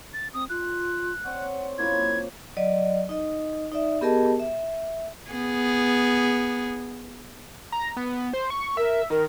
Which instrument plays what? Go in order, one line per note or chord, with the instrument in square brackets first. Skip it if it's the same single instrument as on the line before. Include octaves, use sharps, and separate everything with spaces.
[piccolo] A6
[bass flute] C4 [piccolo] D#6
[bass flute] F4 [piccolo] F#6
[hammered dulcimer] C4 C#5 D5 [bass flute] F#5
[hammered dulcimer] F#2 A#3 F4 [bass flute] E4 [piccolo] G#6
[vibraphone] F#3 D5 D#5
D#4 D#5
D#4 D5 E5
B3 G4 G#4 A#4 D#5 A5
E5
[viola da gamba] B3 G#4
[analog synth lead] A#5
B3
C5
C#6
[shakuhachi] A#4 [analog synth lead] E5
[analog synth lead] D#3 [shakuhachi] A#4